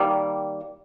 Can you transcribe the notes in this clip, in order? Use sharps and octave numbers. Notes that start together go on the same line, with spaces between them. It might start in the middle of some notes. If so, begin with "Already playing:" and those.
Already playing: D#3 G3 A#3